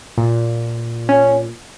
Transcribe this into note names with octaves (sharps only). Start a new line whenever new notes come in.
A#2
C#4